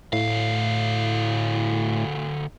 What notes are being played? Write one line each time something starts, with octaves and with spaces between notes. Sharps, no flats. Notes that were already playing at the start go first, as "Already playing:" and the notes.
D2 A2 F5